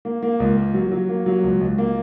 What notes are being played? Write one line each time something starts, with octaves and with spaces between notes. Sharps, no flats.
A#3
A#3
C#2
A#3
F#3
F#3
A#3
F#3
C#2
C#2
A#3